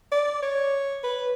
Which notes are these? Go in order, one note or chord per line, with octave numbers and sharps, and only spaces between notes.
D5
C#5
B4